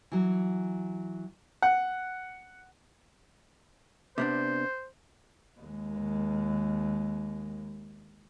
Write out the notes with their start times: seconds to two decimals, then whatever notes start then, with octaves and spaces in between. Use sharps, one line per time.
0.12 E3 F#3
1.62 F#5
4.18 C3 B3 D4 C5
5.60 D#2 G#3